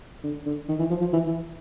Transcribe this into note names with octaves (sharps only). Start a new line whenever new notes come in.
D3
D3
D#3
E3
F3
F3
E3
E3